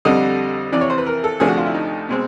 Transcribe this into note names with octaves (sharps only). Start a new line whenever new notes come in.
F2 D3 G3 D#5
F2 C3 E3 D5
C#5
C5
B4
A#4
A4
D2 C3 F3 A3 D4 G#4
F#4
F4
E4
D#4
B2 G#3 C4